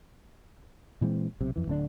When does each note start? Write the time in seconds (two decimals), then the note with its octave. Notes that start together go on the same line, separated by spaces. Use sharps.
1.01 A#2 E3 G#3 C4
1.41 B1 C3
1.56 F2 E3
1.67 D1 D3 D4